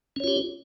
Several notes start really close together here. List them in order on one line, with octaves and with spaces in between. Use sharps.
C#4 C#5 F4 G4